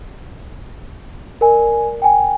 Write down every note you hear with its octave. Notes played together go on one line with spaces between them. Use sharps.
A#4 D5 G#5
G5 G#5